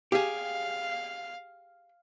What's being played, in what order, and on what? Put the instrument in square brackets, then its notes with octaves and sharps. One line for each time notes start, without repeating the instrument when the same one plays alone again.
[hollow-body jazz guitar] G4 G#4 [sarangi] F5